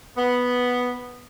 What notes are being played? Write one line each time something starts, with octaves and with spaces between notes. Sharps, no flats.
B3